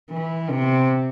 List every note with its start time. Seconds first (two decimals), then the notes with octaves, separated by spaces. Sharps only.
0.11 E3
0.50 C3